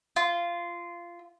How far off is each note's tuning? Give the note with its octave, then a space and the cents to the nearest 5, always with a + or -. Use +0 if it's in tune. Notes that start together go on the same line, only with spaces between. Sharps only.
F4 -15